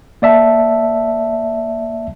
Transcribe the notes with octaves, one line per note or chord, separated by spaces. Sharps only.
A#3 D5 E5 A5